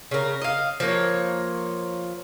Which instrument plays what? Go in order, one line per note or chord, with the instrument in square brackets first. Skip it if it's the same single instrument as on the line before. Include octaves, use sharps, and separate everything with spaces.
[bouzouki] C#3 A#4
D#5 F5
F3 A#3 C#5